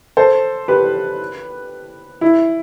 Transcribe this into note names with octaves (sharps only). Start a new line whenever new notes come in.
A4 C5
G4 B4
E4